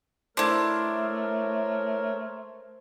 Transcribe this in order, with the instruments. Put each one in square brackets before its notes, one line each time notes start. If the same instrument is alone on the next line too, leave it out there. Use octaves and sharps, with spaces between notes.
[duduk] A3 [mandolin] D4 E4 [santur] A4 C5 [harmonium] A#4 C#5